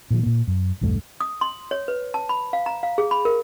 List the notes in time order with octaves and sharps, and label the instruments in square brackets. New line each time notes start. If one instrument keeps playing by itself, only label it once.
[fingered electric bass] A#2 D#3 F3
A#2 A#3
F#2
B1 E2 G2 A3
[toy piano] D#6
C6
C#5
B4
A5
B5
F5
A#5
F5
G#4
B5
A#4